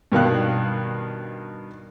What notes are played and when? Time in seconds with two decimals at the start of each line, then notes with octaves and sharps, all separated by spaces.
0.12 G2 B2 D#3 F5 F#6